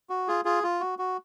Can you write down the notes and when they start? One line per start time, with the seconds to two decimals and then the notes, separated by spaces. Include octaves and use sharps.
0.10 F#4
0.28 F4 G#4
0.45 F4 G#4
0.63 F4
0.81 F#4
0.99 F#4